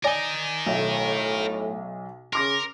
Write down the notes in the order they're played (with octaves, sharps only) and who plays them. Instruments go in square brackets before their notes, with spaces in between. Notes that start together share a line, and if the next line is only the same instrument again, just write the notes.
[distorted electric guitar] A#4 D#5 [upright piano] D5 G#5
[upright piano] B1 E5 [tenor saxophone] A2
[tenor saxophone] C#3 [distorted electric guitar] A#4 [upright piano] C6 D6 A#6